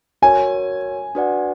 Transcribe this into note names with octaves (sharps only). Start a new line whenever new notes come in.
F#4 A#4 C#5 G#5
D4 F#4 B4 D5 F#5